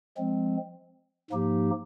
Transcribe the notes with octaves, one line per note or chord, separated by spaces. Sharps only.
F3 G#3 C4
G#2 F3 A#3 D#4 G4